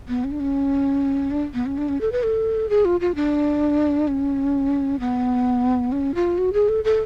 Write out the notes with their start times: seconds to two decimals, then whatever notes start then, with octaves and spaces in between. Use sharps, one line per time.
0.08 B3
0.24 C#4
0.31 D4
0.40 C#4
1.31 D4
1.54 B3
1.66 C#4
1.78 D4
1.89 C#4
2.01 A4
2.12 B4
2.23 A4
2.69 G#4
2.85 F4
3.01 F4
3.15 D4
4.08 C#4
5.00 B3
5.92 C#4
6.15 F4
6.38 F#4
6.53 G#4
6.69 A4
6.84 A4